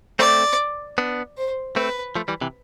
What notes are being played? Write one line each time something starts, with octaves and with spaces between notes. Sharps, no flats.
A3 C4 D5
B3 D4
C5
A3 C4 B4
F3 A3
E3 G3
C3 E3